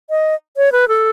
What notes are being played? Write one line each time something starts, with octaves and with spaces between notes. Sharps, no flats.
D#5
C#5
B4
A4